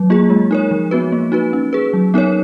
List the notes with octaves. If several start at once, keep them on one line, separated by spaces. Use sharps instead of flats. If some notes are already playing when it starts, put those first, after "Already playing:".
Already playing: F#3
A#3 F4 G#4
G#3
D#4 A#4 C#5
F3
B3 F#4 B4
A#3
D#4 F#4 B4
C#4
G#4 B4
F#3
B3 D#4 A#4 C#5